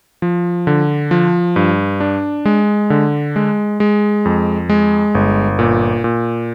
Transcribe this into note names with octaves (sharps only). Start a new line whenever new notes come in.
F3
D3
F3
G2
D4
G#3
D3
G#3
G#3
F2
G#3
G1
A#2
A#2